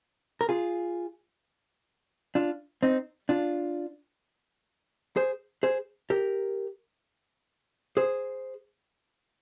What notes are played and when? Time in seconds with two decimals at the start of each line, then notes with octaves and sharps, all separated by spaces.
0.41 A#4
0.49 F4 G#4
2.35 D4 F4
2.83 C4 D#4
3.29 D4 F4
5.16 G#4 C5
5.63 G#4 C5
6.10 G4 A#4
7.97 G#4 C5